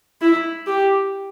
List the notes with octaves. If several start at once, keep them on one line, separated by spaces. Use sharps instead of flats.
E4
G4